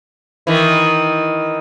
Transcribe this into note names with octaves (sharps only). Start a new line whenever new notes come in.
D#3 E3